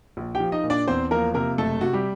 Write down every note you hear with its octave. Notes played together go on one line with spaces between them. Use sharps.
A#1
G4 G5
F3
D#4 D#5
A#2
D4 D5
E2 C4 C5
F3 A#3 A#4
C3 A#3 A#4
F#1 A3 A4
C3 F#4
G3 G4